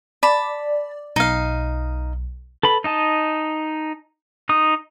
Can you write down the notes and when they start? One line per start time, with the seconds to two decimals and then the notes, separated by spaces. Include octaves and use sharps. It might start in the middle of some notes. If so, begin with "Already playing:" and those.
0.23 D5 A5 B5
1.16 B1 D#4 F5
2.63 A4 B4 B5
2.84 D#4 D#5 A5
4.49 D#4 D#6